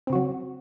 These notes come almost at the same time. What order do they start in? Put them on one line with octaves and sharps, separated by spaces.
C4 C#3 F#4 F#3